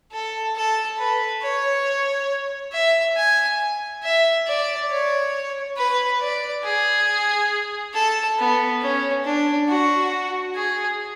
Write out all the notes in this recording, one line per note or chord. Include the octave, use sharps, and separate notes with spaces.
A4
A4
B4
C#5
E5
G#5
E5
D5
C#5
B4
D5
G#4
A4
B3
C#4
D4
F#4
G#4